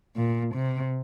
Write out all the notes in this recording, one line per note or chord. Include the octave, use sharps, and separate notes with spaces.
A#2
C3